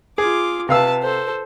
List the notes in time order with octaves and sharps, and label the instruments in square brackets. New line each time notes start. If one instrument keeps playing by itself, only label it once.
[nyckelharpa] F4 D6 [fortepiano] G#4
[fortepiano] C3 F5 E6 [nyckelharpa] B4 A5
[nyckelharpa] A4 C5